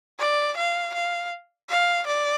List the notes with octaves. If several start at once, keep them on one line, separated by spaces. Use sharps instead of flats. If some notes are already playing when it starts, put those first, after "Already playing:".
D5
F5
F5
F5
D5